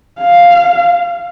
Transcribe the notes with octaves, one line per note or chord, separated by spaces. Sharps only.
F5